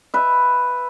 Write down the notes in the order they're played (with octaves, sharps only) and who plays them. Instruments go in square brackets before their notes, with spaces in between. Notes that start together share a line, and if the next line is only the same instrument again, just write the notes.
[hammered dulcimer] B4 E5